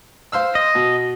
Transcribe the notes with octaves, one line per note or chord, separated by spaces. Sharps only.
C5 F5 E6
D#5
B2